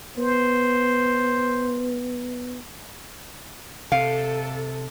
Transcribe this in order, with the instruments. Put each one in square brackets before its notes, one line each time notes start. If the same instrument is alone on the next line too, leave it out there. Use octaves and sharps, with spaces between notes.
[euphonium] B3 [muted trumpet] C5
[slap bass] C3 [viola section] A4 [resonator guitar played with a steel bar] F5